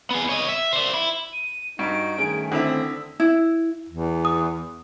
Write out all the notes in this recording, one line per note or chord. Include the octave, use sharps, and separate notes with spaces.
B3 G#4
C#5 D#5
E5
C5 D5
E4
D#7
G2 D#4 F#4 D7
D#3 A3 C#4 G#4
D3 C4 E4 E5 D#6
E4
E2
D#6